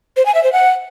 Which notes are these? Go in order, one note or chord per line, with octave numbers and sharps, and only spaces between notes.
C5
G#5
E5
C5
F#5